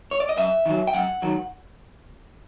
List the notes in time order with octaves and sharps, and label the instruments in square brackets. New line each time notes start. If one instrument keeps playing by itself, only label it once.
[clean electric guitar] C#5
D5
D#5
F#2 E5
D#3 F#3
G5
F#2 F#5
D#3 F#3